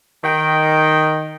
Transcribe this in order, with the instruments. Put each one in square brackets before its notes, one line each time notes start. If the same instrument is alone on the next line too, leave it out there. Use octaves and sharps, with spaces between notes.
[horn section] D#3 G5